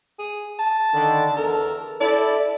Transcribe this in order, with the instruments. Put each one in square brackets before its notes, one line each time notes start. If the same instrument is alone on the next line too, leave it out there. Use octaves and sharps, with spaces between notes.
[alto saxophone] G#4
A5
[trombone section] D3 D#3
[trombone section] E2 A4 [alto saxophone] A#4
[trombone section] E4 A4 [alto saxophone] D5